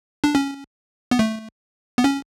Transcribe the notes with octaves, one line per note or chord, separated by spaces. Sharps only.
D4
C#4
B3
A3
B3
C#4